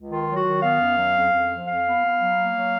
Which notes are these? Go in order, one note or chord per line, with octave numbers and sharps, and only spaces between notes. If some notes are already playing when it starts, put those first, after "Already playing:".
Already playing: C#2
D#3 F4
F#3
F#4
D#3
B3 F5
F#2
F#3
F2
F2
F3
F2 F5
B3
B3
F#3
A#3
F#3